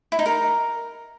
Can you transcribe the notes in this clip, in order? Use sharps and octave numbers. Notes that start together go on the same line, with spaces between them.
E4
D#4
A#4